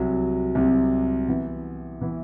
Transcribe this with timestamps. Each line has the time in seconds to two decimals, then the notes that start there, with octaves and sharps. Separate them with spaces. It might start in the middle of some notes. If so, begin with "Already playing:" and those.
Already playing: C2 C3 F#3
0.55 C2 C3 F#3
1.28 E3 B3 E4
2.01 E3 B3 E4